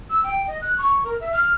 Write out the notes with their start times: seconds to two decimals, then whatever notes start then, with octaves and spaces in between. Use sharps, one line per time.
0.10 E6
0.23 G5
0.47 D#5
0.61 F#6
0.78 C#6
1.04 A#4
1.20 E5
1.33 F6